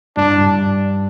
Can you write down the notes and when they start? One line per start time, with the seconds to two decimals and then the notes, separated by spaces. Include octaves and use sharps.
0.17 G2 D4
0.38 G2